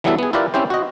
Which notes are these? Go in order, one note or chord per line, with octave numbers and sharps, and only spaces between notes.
E3 F#3 G3 B3 E4 A4
B3 G#4
E4 F4 G4 A#4 B4 D5
C4 C#4 E4 G4 C5
F#4 D#5